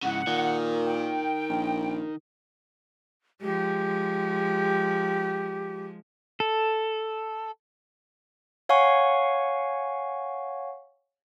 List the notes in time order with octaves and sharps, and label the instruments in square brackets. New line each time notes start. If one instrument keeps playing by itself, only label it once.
[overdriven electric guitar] G#2 C#3 [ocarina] E4 [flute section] F#5
[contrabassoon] A#2 [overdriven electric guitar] D#3 [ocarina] A#4
[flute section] G5
[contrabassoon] A#1
[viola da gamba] F3 G#3 [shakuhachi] G4
[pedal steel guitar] A4
[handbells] C#5 F5 F#5 G#5 C#6